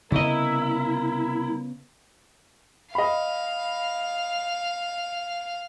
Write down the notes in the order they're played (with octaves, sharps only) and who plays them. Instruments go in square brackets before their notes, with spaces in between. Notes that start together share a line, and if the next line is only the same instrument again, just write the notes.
[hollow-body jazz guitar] C2 D#5 [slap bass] C#3 B3 [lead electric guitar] E4 [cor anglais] A#4
[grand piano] D#5 B5 [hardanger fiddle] F5